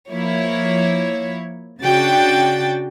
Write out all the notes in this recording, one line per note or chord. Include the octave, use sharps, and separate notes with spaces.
F3 A#3 E4 C#5
C#3 D4 F#4 G5 A6